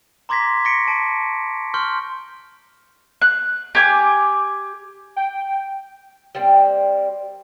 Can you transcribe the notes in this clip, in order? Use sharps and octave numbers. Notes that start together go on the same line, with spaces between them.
A#5 C6 D6 G#6 A#6 B6
C#6 A#6 B6 C#7 D7
A5 D7
C6 C#6 F6 G6
F#6
G4 G#5 D6
G5
G3 A#3 C4